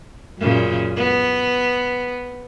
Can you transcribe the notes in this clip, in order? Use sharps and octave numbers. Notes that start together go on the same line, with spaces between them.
F#2 A#2 C#3
B3